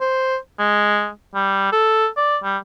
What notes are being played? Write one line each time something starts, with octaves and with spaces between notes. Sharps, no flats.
C5
G#3
G3
A4
D5
G3